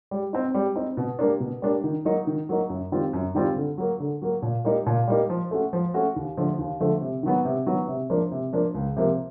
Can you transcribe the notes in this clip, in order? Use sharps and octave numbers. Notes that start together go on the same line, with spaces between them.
G3
C4 D#4
G3
C4 D#4
B2
G3 A#3 D4
B2
G3 A#3 D4
D#3
F#3 A#3 D#4
D#3
F#3 A#3 D#4
F#2
D#3 G3 C4 F4
F#2
D#3 G3 C4 F4
D3
F#3 A#3
D3
F#3 A#3
A#2
G3 A#3 D#4
A#2
G3 A#3 D#4
F3
A3 C#4 F#4
F3
A3 C#4 F#4
D#2
D3 F3 A3
D#2
D3 F3 A3
C3
D#3 F#3 B3
C3
D#3 F#3 B3
C3
F3 A#3 D4
C3
F3 A#3 D4
C#2
C3 F3 A#3